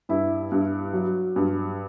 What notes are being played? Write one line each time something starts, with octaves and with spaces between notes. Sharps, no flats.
G2 E4
G2
F#3
G2